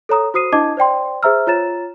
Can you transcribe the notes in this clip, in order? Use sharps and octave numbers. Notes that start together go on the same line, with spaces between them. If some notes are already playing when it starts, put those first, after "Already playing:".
A4 C#5 A#5 D#6
F#4 C5 D#6 C7 D#7
D4 E4 D#5 A5 D6 G#6
C5 D5 G5 C6
G#4 C5 E5 A#5 E6 F6
F4 C#5 A#5 A6 E7